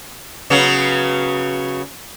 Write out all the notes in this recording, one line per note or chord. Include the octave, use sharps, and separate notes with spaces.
C#3 F#3 B3